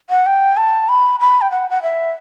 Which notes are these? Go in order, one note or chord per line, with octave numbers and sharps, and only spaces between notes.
F#5
G5
A5
B5
B5
G5
F#5
F#5
E5